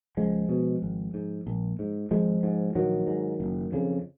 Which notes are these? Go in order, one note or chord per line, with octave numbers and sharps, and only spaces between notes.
C#2 F3 G#3
B2
G#1
G#2
A#1
G#2
G#1 F3 G#3
G#2
A#1 D#3 F#3
G#2
F#1
F2 C#3